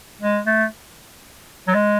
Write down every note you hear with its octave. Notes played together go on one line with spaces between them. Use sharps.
G#3
A3
F#3
G#3